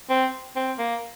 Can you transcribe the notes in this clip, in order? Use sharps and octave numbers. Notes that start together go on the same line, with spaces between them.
C4
C4
A#3